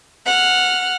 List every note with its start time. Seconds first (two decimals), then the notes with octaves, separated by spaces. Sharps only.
0.26 F#5 F6